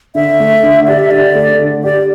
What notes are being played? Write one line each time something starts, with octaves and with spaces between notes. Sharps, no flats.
D3 E5
A3
D3
G4 D5
E5
D3 D5
A3
D3
G4 D5